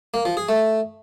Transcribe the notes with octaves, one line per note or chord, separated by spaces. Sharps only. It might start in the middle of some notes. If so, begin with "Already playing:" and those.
A#3
F3
G#4
A3